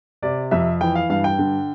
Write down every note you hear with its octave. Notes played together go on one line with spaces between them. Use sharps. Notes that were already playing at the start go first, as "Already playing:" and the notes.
C3 D5
F2 E5
E3 G5
F5
G2 F5
G5
D3